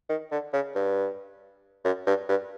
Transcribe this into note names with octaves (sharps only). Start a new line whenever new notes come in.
D#3
D3
C#3
G2
F#2
G2
G2